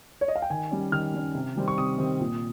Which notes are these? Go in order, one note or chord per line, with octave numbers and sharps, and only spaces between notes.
C#5
D#5
F5
G5
D#3 G#5
G3 C#4
D#3 F6
G3 C#4
C3
D#3 G3 C4
C#6
C3 D#6
D#3 G3 C4
A#2